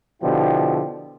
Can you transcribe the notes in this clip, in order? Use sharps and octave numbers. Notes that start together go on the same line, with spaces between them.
B2 D3 F3 E4 G4